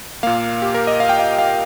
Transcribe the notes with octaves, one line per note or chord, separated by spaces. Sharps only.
A#2 A#3 F5
G4
A#4
D#5
F5
G5
F5
F5